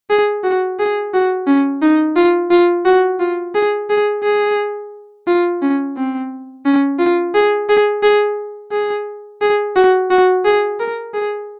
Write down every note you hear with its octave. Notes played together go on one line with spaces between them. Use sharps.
G#4
F#4
G#4
F#4
C#4
D#4
F4
F4
F#4
F4
G#4
G#4
G#4
F4
C#4
C4
C#4
F4
G#4
G#4
G#4
G#4
G#4
F#4
F#4
G#4
A#4
G#4